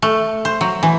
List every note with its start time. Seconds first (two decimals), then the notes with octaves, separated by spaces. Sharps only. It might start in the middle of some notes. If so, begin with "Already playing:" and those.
0.02 A3
0.45 C5
0.61 F#3
0.83 E3